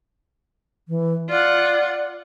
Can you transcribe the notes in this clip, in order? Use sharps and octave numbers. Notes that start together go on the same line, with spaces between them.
E3
F4 D5 F#5